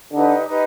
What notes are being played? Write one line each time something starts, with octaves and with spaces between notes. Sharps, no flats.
D3 D#4 G4 B4 D#5
D#4 G4 B4 D#5